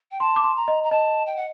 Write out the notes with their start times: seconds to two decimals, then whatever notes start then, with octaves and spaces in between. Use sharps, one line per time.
0.11 G5
0.20 A5 C6
0.36 D6
0.44 C6
0.56 A#5
0.68 D#5
0.83 A#5
0.91 D#5 A5
1.26 G5
1.36 F#5